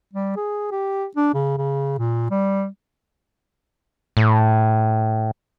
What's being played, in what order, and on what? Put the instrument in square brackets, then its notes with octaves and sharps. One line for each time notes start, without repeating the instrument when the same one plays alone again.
[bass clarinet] G3
G#4
G4
D4
C#3
C#3
A#2
G3
[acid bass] A2